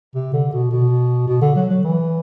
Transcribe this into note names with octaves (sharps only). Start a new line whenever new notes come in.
C3
D3
B2
B2
B2
D3
F#3
F#3
E3